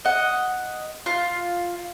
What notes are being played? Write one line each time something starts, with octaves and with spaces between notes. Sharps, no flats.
D#5 F#5
F4